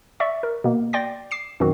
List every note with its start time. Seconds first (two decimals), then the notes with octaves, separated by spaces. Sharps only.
0.20 D5 E5 C#6
0.43 A#4
0.64 B2 A#3
0.93 D5 G5 C6 D6 A#6
1.31 D6 C7 E7
1.60 F#2 B2 D#3 C4 F#4